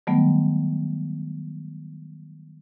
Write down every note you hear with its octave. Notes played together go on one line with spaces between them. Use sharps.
D#3 F#3 G3 A3 B3